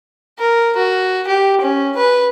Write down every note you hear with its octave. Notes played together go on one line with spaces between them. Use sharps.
A#4
F#4
G4
C#4
B4